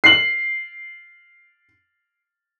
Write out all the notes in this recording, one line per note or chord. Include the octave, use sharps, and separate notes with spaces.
C7 F#7